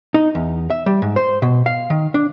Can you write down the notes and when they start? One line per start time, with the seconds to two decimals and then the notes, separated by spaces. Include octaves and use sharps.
0.14 D#4
0.35 E2
0.70 E5
0.86 G3
1.02 G#2
1.16 C5
1.42 B2
1.66 F5
1.90 D#3
2.14 D4